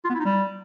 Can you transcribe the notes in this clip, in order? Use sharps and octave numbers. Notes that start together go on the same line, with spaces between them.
F4
B3
E4
D#4
G3